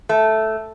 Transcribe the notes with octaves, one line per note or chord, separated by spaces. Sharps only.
A3